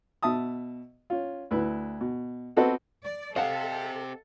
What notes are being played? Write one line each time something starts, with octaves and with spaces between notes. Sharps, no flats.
B2 E5 A5 D#6
C#4 F4
D2 E4 B4
B2
B3 C4 F#4 A4 B4 D#5
D5
C4 G4 A4 D#5 F5 F#5 A5